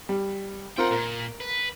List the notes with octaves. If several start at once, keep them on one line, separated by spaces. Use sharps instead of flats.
G3
C4 F4 A#4 F#5 G5
A#2 A#4
B4